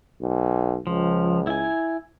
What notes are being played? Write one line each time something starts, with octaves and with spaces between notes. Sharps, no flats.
B1
C#2 F3
E4 G#5